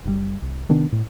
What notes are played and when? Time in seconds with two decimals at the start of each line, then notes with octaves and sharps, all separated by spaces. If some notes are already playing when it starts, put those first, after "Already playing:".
0.05 F#1 C3 G3
0.42 C2
0.69 C3 D#3 B3 D4
0.92 A2